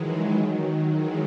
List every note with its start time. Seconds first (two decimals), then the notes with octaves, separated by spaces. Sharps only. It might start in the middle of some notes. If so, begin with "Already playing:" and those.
Already playing: D#3 E3 F#3 G#3
0.89 E3 G#3